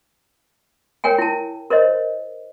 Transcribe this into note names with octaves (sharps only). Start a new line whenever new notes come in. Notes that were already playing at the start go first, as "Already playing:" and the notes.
A#4 C#5 G5 G#5
E4 A5
A#4 C5 C#5 D#5